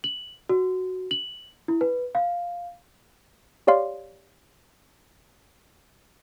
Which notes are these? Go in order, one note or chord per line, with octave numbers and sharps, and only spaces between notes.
F#7
F#4
F#7
E4
B4
F5
G4 C#5 D5 F5 C6